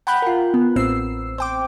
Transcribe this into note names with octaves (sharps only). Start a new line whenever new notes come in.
F#5 G5 B5 F#6 G6
F4 A#4
B3
A1 A2 C4 E6 C7
C5 G5 D6